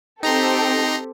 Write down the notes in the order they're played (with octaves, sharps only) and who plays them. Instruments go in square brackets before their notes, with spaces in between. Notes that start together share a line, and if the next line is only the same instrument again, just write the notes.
[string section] C4 G4 A4 [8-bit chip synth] D#4 A#5 C6